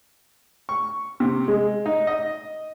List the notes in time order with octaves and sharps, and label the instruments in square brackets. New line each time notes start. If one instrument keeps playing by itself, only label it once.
[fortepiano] C#6
C3
G#3
D#4
D#5